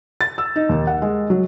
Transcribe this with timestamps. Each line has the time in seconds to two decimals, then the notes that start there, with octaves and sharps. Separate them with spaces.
0.21 A6
0.38 E6
0.56 D#4
0.69 D#2
0.87 F#5
1.02 G#3
1.30 F#3